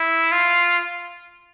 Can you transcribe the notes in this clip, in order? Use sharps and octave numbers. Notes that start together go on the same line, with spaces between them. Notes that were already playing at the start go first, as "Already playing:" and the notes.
Already playing: E4
F4